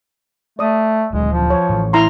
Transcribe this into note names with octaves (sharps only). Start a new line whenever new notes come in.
A3 D5 D#6
D2 A#2 F#3 G#3
F3
C#5
A2 E3
E4 A#5 C6